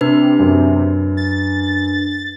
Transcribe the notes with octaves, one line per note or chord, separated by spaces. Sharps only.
C3 D4 B4
F#2
A6